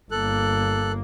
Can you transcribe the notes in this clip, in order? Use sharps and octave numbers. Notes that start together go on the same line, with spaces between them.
G1 A#3 A4 F#6